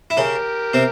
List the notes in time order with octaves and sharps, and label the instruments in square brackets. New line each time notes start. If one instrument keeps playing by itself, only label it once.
[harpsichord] E4
[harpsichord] C#3 C#4 [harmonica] G4 A#4
[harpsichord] C3 C4